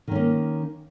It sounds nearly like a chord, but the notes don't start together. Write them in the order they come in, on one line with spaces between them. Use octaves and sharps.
D#3 C#4 A#3